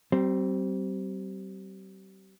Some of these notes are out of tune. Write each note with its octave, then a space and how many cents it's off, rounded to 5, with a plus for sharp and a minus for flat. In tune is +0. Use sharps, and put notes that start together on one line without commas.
G3 -35 C4 +0